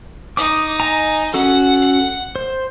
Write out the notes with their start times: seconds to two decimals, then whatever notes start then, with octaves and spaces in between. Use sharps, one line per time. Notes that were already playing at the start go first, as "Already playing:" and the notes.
0.37 D#4 D6 D#6
0.80 D#5 G#5 A#5
1.34 C#4 F#4 A4 F#5
2.36 C5